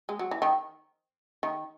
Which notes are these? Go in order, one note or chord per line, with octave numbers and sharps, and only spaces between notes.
G#3
F#3
E3
D#3
D#3